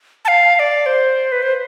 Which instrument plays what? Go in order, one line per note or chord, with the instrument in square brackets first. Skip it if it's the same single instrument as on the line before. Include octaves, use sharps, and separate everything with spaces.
[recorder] A5
F5
F5
D5
C5
B4
C5